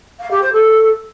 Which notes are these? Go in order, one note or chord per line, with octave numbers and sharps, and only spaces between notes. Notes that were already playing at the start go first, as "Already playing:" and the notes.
F5
G4
C5
A4